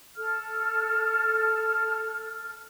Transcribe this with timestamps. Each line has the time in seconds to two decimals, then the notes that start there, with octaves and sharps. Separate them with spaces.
0.17 A4 F6